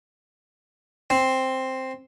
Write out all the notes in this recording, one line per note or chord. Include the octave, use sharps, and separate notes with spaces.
C4